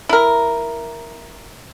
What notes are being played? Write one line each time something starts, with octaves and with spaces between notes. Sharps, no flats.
E4 A#4